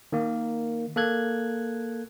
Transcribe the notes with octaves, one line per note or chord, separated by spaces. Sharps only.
D#3 A#3
A#3 A4 F#6 G#6